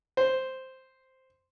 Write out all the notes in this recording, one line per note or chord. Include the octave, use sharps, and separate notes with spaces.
C5